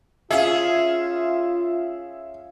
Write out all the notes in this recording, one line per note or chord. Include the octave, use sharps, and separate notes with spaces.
C#4 F4 G#4 E5 F5